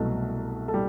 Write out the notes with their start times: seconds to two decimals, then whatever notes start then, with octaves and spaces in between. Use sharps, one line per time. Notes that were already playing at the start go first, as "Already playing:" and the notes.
Already playing: C2 B2 F#3 A3 A4
0.68 A4
0.74 G3